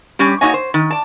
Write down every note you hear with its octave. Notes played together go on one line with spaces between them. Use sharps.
G3 C#4 G4
A#3 D#4 F#4 C#5 D#5 G#5
C5
D#3
D5 A5